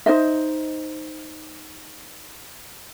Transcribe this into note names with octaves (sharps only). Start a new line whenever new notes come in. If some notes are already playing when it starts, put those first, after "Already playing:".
D#4 C5 D#5 E5